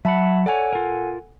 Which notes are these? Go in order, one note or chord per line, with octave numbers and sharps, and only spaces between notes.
F#3 E5 F#5 A5 B5
A4 C#5 D5 F#5 G#5
F4 A#4